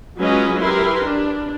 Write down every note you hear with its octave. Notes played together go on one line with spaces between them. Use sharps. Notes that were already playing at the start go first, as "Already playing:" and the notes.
F#3 G#3 C#4 F4 B4 D#5
E4 G4 A#4 B4 C6
D4